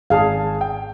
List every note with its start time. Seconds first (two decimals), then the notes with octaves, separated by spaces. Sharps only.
0.10 G#1 G#4 F5 G#5 A5
0.61 G5